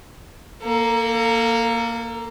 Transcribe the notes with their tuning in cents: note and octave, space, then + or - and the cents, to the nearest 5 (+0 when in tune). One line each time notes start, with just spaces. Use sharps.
A#3 +0 A4 +35